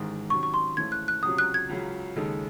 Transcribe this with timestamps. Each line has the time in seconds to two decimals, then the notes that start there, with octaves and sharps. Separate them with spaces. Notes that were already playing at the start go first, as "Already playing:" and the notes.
Already playing: A1 G#2 D#3 G#3
0.30 C3 D#3 F#3 C#4 C#6
0.43 C#6
0.54 C6
0.77 G#1 G#2 E3 A3 C#4 G#6
0.92 F#6
1.08 F#6
1.23 C#2 C3 F#3 C#4 D#6
1.38 F#6
1.54 G#6
1.69 C#2 C#3 F#3
2.16 D#2 C#3 G#3 D#4 A4